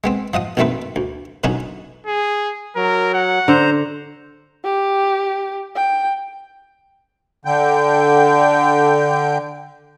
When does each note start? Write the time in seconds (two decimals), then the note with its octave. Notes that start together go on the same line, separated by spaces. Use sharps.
0.04 G#3 B3 C4
0.34 F3 D#5 F#5 D#6
0.57 A#1 B2 D#3 A3 C4 B4
0.96 D2
1.44 B2 D3 F#3 C#4 D#4 F#4
2.07 G#4
2.76 F#3 A#4
3.14 F#5
3.48 D3 C5 A#5
4.64 G4
5.75 G5
7.45 D3 G5